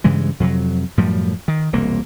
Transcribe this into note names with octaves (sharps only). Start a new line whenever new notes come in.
G2 C#3 E3 G#3
F2 C3 F#3
F#2 A2 F3 G3
D#3
E1 C2 A#3